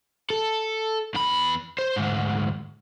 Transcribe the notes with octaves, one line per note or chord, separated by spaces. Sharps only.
A4
E2 B5
C5
D2 G#2